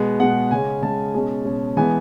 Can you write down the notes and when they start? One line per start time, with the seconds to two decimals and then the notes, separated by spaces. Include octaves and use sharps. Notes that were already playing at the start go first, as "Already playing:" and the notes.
Already playing: B2 G#3 B3
0.20 B2 G#3 B3 F#5
0.51 C#3 G#3 C#4 G#5
0.82 C#3 G#3 C#4 A5
1.14 B2 G#3 C#4
1.45 B2 G#3 C#4
1.77 E3 G#3 B3 G#5